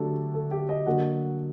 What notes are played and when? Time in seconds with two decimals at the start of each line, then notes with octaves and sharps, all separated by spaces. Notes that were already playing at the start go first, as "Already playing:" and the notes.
Already playing: D3 F#3 A3 D4 G4 A4
0.34 A4
0.51 G4
0.69 D#5
0.86 D3 F#3 A#3 F#5